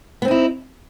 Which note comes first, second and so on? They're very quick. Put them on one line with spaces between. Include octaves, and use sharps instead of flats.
B3 C4 D#4 E4